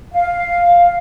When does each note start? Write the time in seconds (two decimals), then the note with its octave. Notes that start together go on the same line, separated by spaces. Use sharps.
0.13 F5